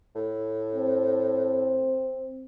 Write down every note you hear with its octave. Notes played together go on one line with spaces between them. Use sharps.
A2
C4